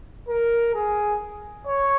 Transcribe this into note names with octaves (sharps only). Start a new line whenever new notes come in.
A#4
G#4
C#5